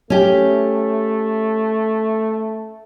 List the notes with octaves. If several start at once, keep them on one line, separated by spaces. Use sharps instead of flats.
A3 C#4 G4